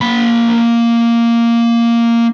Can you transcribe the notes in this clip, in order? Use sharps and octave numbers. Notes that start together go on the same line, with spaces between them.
A#3 B5